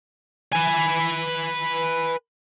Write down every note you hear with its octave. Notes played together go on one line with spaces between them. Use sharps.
B4 G#5